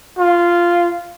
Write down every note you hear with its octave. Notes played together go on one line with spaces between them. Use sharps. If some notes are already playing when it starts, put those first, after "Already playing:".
F4